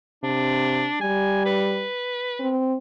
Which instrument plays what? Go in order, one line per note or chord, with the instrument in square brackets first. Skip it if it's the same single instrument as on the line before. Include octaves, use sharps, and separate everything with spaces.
[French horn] C3 [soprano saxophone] D4
[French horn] G3 [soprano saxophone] G#5
[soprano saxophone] B4
[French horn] C4